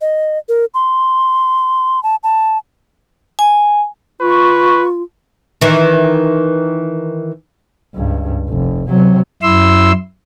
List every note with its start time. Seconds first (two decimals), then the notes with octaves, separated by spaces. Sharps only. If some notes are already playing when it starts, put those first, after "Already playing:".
0.01 D#5
0.49 A#4
0.74 C6
2.03 A5
2.23 A5
3.39 G#5
4.21 F4 B4 C#6
5.61 D#3 E3
7.95 C#2 G2
8.49 F1
8.89 C3 F#3
9.42 F#2 E4 C6 E6